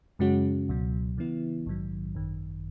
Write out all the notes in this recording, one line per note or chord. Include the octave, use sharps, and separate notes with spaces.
F#2 C#3 G#3 C#4 F#4
C#2 B2 F#3
C#3 E3 B3 E4
A#1 G#2 D#3 F#3
G#1 F#2 D#3